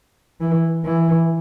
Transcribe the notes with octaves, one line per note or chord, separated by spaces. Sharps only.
E3
E3